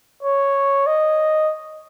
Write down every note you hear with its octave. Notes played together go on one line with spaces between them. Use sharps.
C#5
D#5